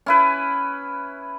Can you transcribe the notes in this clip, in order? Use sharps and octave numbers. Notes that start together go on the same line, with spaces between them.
C#4 E4 B4